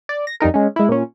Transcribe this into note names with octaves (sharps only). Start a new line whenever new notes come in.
D5
A#6
F2 G3 D#4 A#4
G#3 C#4
G#3 E4
A#2 C#4